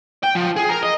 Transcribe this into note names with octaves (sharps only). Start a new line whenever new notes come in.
G5
F3
G#4
A#4
D#5